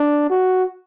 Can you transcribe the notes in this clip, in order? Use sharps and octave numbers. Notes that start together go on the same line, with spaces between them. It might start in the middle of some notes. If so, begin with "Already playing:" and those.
Already playing: D4
F#4